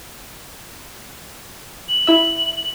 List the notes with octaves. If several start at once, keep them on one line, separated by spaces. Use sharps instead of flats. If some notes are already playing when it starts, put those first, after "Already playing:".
F#7
E4 E5